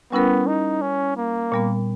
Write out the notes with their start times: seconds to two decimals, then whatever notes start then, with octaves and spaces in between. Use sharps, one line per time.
0.12 G3 B3 C#4 E4 A#4
0.47 D#4
0.82 C#4
1.17 A#3
1.52 A#2 G3 B3